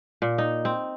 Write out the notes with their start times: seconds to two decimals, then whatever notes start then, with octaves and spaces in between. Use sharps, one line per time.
0.22 A#2
0.38 D#4
0.65 C4